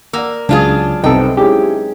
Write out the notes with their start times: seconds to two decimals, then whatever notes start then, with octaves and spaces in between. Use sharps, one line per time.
0.13 A#3 D5 F#5 E6
0.49 C#2 F#3 D4 F4 G#4
1.04 C2 B3 C4 D#4 A4 G5
1.37 G#3 C#4 D#4 E4 G4 G#4